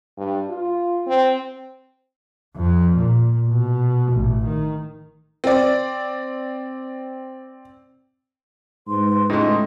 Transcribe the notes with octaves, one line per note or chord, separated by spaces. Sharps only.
G2
F4
C4
F2
A#2
B2
A1
D#3
C4 D5
G#2 B4 C6
C#2 A2 G#3 A3 D#4 D#5